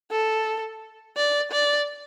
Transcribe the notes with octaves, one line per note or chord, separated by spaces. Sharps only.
A4
D5
D5